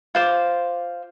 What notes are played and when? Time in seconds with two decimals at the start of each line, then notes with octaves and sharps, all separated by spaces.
0.15 F4 C5 D6